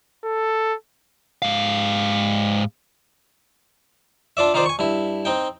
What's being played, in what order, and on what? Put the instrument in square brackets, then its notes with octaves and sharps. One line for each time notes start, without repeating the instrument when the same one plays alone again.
[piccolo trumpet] A4
[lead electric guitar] G#2 F5
[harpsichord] D4 F4 D5 E5
D#3 D#4 F4 C5 D5
G#5 C#6
G2 E4
C4 D#4 G5